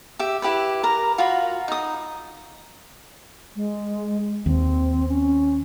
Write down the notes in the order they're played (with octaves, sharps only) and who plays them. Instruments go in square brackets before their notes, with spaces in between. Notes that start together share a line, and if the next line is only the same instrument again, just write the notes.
[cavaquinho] G4 E5
E4 G4 B4 B5
A#4 A#5
F4 F#4 B5
D#4 D#6
[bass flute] G#3
[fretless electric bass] D#2 [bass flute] C4
[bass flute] C#4